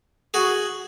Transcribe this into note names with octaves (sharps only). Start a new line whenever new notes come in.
F#4 G#4